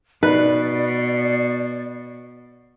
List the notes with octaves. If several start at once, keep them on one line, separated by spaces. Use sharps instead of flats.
B2 D#4 B4 D5